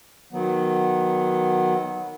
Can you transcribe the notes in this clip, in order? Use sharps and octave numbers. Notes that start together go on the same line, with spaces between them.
D#3 F#3 B3